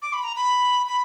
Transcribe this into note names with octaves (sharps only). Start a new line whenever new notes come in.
D6
B5
A#5
B5
B5